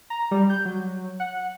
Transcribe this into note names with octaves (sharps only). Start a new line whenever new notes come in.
A#5
G3
G6
F#3
F#5